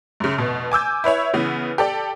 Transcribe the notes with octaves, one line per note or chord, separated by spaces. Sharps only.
F#2 C#3
F1 B2
G#5 D6 E6 G6
E4 B4 C#5 E5
C#3 E3 B3
G4 A4 D5